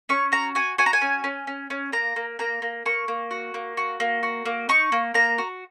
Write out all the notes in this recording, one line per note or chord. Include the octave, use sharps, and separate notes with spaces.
C#4 C#6
F#4 A#5
F#4 G#5
F#4 G#5
A#5
G#5
C#4
C#4
C#4
C#4
A#3 A#5
A#3
A#3 A#5
A#3
A#3 C#6
A#3
F#4
A#3
F#4
A#3
F#4
A#3
D#4 C#6
A#3
A#3 A#5
F#4